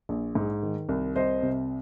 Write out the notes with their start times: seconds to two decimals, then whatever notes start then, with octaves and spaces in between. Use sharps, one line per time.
0.09 A#1
0.35 G#2
0.63 D#3
0.89 C2
1.16 C2 C5 D#5
1.42 C3